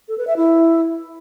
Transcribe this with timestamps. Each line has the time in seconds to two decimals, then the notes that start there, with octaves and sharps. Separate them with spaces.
0.08 A4
0.18 B4
0.27 E5
0.37 E4